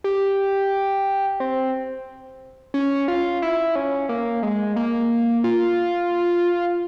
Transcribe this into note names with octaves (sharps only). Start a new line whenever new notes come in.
G4
C4
C#4
F4
E4
C#4
A#3
G#3
A#3
F4